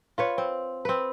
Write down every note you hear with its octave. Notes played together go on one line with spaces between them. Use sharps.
F4 B4 C#5
C4
C4 B4